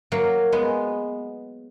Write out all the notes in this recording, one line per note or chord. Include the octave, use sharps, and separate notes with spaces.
F#3 A#3
G#3 B3